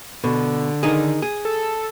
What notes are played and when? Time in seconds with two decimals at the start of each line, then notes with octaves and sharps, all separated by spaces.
0.24 B2 D3
0.83 D#3 D#4 G#4
1.22 G#4
1.45 A4